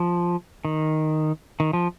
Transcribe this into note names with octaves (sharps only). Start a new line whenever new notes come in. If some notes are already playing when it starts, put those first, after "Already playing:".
Already playing: F3
D#3
D#3
F3